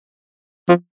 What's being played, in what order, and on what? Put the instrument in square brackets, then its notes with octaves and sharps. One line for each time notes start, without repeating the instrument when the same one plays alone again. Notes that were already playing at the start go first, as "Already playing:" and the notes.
[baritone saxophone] F3